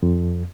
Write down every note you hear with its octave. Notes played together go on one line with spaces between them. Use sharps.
F2